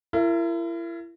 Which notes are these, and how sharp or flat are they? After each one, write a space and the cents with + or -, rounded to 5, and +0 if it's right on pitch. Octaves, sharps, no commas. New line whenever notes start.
E4 +35 A#4 -25